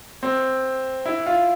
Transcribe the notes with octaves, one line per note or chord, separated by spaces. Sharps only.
C4
E4
F4